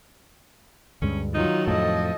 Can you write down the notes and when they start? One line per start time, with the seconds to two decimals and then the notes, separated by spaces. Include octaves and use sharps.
1.02 D2 G2 G#3 C#4
1.35 D#3 F#3 D#4 F4
1.67 F2 A2 F3 A4 D#5